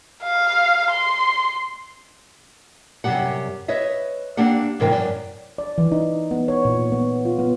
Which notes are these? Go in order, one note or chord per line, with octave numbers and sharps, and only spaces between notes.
F5
C6
F#2 C3 F3 G3 G4 F#5
B4 C#5 D#5 E5
A#3 C4 D4 G4 F#5
G#2 C3 E3 A#4 C5 G5
F#2 D5
D5
E3
D#4
B3
C#5
A#2
B3
F4
B3